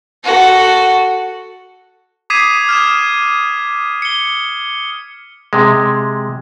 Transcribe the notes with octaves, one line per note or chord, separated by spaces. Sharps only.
F#4 A4
D6 D#6 G#6 B6 C7 D#7
F6 G#6 E7
C#7 G7
C3 G#3